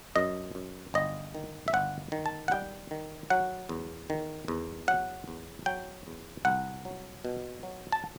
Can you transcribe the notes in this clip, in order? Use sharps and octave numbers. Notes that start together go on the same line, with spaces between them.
F#2 D#5
F#2
G1 D#5
D#3
E5
G1 F#5
D#3
A5
F#5
G3 G5
D#3
F#3 F#5
E2
D#3
E2
F#3 F#5
E2
F#3 G5
E2
C2 F#5
F#3
B2
F#3
A5